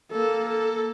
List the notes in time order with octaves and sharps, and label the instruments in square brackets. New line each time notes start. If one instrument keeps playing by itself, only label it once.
[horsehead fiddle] A#3 [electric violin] A4
[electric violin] A4